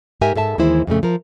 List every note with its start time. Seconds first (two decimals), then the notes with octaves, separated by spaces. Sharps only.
0.21 G#2 G4 A#4 E5 G#5
0.35 G#2 A4 E5 A5
0.58 D#2 E3 G#3 E4 C5
0.87 F2 A#2 C#3 A3
1.03 F3 A#4